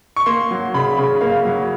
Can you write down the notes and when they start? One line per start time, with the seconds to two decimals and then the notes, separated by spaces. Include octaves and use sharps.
0.16 C#6
0.26 A#3 C6
0.51 F#3
0.74 C#3 B5
0.98 C#3
1.21 A#3 F5
1.45 F#3